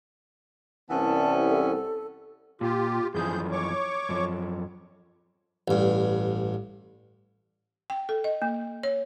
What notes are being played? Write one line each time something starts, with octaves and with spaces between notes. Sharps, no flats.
C2 E3 B3 C#4 A5
A4
A#2 F4 G4
F#2 E3 F3 G#4 G6
C#5 C#6 D6
F#2 F3
A1 G2
G5
A4
D#5
A#3
C#5